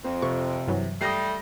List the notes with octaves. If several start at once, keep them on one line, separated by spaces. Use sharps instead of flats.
F2 C4
C3 C#6
G2 E3 F#3
G3 A3 D#6 A#6 C7